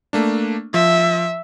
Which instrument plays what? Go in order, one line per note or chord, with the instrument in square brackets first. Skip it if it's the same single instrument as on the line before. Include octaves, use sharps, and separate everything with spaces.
[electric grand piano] A3 A#3 D4
[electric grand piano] F3 [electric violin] E5